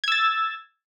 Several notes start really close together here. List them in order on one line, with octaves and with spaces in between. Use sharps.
G#6 E6 A6